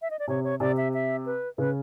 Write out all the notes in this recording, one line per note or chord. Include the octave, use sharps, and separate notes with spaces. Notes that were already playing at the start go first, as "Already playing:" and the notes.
E5
D#5
D5
C3 C#5
C#5
C3 D5
E5
E5
B4
C#3 B4